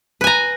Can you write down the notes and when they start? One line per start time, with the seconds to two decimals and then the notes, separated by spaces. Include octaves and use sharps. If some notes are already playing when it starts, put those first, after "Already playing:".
0.21 B4
0.24 G#5
0.27 A#5